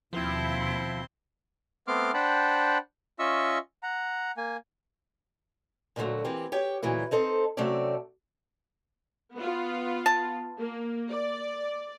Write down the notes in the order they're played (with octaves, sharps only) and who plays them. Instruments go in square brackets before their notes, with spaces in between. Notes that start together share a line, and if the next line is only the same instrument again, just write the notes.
[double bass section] D#2 B2 [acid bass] F3 [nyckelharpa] C4 C6 [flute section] E4
[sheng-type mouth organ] A3 B3 C4 C6 D6 F6
D4 C5 F#5 G5 A5 B5
C#4 F4 D#5 E5 C#6 E6
F#5 A#5
A#3 G#5
[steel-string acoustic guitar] D2 A#2 D3 F3 F#3 A3
E3 A#3 C4 G4
G4 C#5 G5
D2 A#2 E3 F#3 E4
C4 D#4 A4 C5
C3 F#3 A3 C4 C#4 D5
[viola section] B3 F4
[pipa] A5
[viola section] A#3
D5